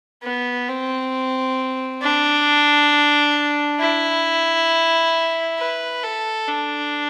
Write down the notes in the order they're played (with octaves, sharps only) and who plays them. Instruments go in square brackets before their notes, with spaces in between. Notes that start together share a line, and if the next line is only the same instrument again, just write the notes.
[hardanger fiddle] B3
C4
D4
E4
B4
A4
D4